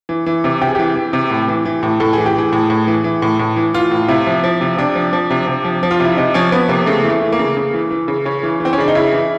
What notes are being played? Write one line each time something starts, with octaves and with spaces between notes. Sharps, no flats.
E3
E3
C3
C3 G4
G#4
E3 G4
E3
C3
A2
E3
E3
A2
A2 A4
E3 G#4
G4
E3 G#4
A2
A2
E3
E3
A2
A2
E3
E3 F4
A2
C3 E4
F3
F3
C3
C3 D4
F3
F3
C3
C3
F3
F3
F4
C3 E4
C3 D#4
F3 C#4
F3 B3
C3 A#3
C#3 A3
E3
A3
E3
A#3
C#3
C#3
E3
E3
C#3
C#3 C#4
E3
E3
C4
C#4
C#3 D4
D#4
C#3 E4
E3